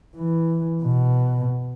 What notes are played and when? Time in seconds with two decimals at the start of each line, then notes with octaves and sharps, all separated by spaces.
0.16 E3
0.83 B2